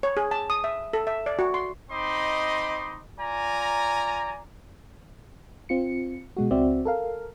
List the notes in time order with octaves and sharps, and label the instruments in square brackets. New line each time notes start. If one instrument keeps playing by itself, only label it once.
[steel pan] C#5
G#4
A5
D#6
E5
A4
E5
D5
F#4
C6
[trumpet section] C4 D#4 D#5 B5 C6 D6
F4 D5 G#5 A#5
[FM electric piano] C4 F4 C#7
B2 G#3 F#4
C#2 C4 F#4 D5 E5
A4 A#4 F5